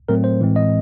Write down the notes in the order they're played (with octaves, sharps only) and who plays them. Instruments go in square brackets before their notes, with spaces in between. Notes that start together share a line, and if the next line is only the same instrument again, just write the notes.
[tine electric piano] A2 F#3 A3 C4 A#4
C5
A2 E3 G#3 C4
D#5